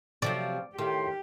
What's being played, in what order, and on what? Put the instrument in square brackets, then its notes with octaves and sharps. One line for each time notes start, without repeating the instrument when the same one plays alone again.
[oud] C3 F3 F#3 [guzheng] D5
[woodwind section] A2 C6 [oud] D#3 [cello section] G4